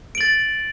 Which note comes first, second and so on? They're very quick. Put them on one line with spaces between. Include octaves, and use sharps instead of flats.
D7 F#7 A6